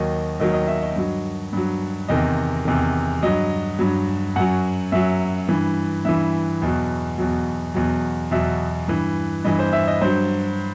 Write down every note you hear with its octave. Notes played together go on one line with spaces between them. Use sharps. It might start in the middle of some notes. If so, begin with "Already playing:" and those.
Already playing: D#2 D#3 F#3 D#5
D#2 D#3 F#3 D#5
D#5
E5
D#5
G2 F#3
G2 F#3
E2 C3 D#3 D#5
E2 C3 D#3
G2 F#3 D#5
G2 F#3
F#2 F#3 F#5
F#2 F#3 E5
G2 E3
G2 E3 E5
E2 B2 F#3
E2 B2 F#3
E2 B2 F#3
E2 B2 F#3 E5
G2 E3
G2 E3 D#5
C5
E5
D#5
G2 F#3 C5